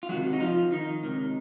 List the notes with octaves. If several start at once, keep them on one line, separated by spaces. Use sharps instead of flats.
F4
C#2 C3 D#3 F#3 F#4
D#4
F3 F4
D#3 D#4
C#2 C3 D#3